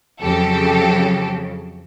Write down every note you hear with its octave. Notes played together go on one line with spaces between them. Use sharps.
F2 C#3 F#3 G4 A4